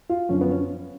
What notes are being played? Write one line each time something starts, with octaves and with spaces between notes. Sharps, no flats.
F4
F#2 D3 F3 C#4
B3
C#4